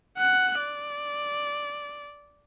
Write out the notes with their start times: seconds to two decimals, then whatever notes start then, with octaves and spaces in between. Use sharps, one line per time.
0.18 F#5 F#6
0.60 D5